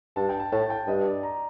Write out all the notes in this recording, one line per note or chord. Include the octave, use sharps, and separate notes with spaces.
G2 A5
G5
A5
A2 A5
G5
G2 D#5
D5
A#5